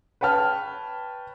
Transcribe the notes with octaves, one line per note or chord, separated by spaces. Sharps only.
B4 C#5 G5 A5 F6